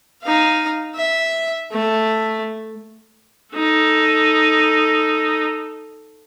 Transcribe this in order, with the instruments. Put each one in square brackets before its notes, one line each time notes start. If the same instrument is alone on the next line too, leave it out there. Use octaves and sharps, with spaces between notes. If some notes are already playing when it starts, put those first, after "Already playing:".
[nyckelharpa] D#4 F5
E5
A3
[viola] D#4 A4